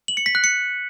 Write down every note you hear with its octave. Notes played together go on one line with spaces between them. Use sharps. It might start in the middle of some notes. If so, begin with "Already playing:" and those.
F#7
C#7
B6
F#6
C#7